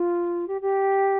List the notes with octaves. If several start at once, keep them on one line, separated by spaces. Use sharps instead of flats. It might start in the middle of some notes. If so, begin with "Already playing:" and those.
Already playing: F4
G4
G4